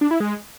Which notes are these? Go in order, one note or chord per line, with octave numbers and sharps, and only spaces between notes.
D4
E4
G#3